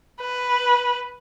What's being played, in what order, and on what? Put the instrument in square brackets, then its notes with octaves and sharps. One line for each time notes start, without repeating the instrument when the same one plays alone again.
[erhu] B4